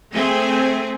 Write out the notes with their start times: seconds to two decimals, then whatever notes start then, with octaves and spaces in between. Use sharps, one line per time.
0.12 A3 C4 G#4